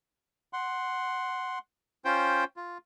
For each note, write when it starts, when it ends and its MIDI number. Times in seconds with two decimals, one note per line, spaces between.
0.53 1.59 78
0.53 1.59 84
2.05 2.44 61
2.05 2.44 65
2.05 2.44 72
2.05 2.44 79
2.56 2.78 65